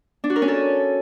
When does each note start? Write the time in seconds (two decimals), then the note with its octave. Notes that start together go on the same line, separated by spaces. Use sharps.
0.24 D4
0.30 F#4
0.36 A#4
0.42 C#4
0.48 A4